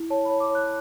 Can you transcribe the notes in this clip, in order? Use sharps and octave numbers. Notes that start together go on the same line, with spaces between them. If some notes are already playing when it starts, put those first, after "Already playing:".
Already playing: E4
C#5 A5
C#5 B5
D6
C#5
F#6